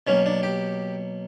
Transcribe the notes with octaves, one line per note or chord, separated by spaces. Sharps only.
B2 F#3 A#3 C#4
D4
G4